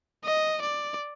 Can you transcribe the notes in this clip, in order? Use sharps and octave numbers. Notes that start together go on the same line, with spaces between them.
D#5
D5